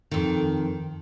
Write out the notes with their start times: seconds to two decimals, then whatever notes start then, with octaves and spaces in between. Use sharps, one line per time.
0.11 F2 D#3